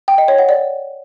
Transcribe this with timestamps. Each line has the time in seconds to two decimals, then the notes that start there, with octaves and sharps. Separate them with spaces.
0.08 G5
0.18 D#5
0.28 C#5
0.38 F#5
0.49 D5